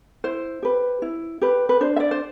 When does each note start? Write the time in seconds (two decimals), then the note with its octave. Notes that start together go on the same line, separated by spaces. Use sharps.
0.24 E4 C5
0.62 G4 B4
1.02 E4
1.41 G4 B4
1.69 B4
1.81 D4 C5
1.96 E5
2.00 D5
2.11 C5